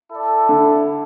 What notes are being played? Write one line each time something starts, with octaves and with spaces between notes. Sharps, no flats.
E4 A4 D5
D3